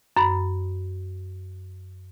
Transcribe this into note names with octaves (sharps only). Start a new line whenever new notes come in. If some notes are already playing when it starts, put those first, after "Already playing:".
F#2 B5